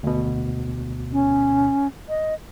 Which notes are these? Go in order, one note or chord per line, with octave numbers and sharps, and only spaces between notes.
D2 B2
C#4
D#5